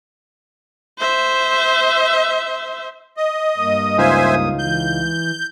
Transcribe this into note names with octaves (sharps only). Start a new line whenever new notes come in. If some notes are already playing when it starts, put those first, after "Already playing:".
C5 E5
D#5
G2 A#3 D#6
C#2 D#4 C5 E5 F5 G#5
E3 G6